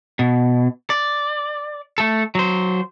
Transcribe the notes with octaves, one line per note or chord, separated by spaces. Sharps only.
B2
D5
A3 A4
F#3 C5